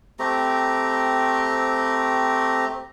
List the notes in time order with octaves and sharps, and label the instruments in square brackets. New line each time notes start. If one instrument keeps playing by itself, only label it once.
[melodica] A3 C4 G4 A#5